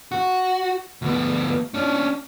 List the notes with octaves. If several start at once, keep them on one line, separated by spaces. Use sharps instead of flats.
F#4
D2 B3
C#4 D4